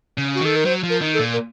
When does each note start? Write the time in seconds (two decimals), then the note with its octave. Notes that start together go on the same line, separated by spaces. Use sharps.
0.18 C#3
0.35 F#4
0.41 D#3 A4
0.56 A#4
0.65 F#3 C5
0.83 F3
0.90 A#4
1.01 D#3
1.14 A4
1.19 A#2
1.33 A#4